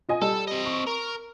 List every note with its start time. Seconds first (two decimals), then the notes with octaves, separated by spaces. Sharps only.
0.09 F4 D#5 G#5
0.22 G3 A4
0.47 C4 D#5
0.65 C#6
0.87 A#4